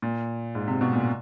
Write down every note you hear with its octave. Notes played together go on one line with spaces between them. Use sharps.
A#2
G#2
C3
B2
A#2